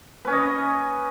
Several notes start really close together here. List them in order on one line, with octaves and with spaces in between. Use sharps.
B4 C#4 C#5 D#5